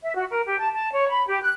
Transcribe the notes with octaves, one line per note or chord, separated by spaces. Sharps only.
E5
F#4
A#4
G4
A5
A5
C#5
B5
G4
F#6